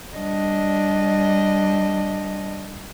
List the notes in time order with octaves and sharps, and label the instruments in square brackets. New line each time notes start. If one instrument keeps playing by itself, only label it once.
[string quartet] G3 D4 D#5